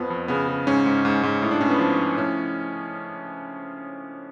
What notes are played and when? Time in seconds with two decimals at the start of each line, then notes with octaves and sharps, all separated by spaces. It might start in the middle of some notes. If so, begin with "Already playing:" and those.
Already playing: F2 F3 B3
0.10 F2
0.28 C#3 B3
0.48 C#3
0.67 G#2 C#4
0.86 G#2
1.05 G#2
1.23 G#2
1.42 A2
1.51 D4
1.61 A2 C#4
1.70 B3
1.79 F3
1.98 F3
2.17 A2 C#4